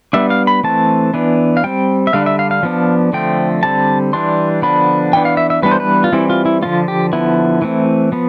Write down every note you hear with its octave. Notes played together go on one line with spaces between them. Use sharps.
G3 B3 D4 E5
F5
B5
E3 A3 C4 A5
E3 B3 D4
F5
G3 C4 G5
E5
D3 G3 D4 F5
E5
F5
F5
F3 B3 D4
D3 F3 A3 C4 G5
D3 G3 C4 A5
E3 G3 D4 C6
D3 F3 B3 D4 B5
E3 B3 D4 G5
F5
E5
E5
E3 G3 B3 D4 B4
C5
B4
F4
E3 G3 C4 E4
F4
E4
D3 F3 C4 F4
G4
D3 F3 B3 E4
E3 A3 C4
F3 B3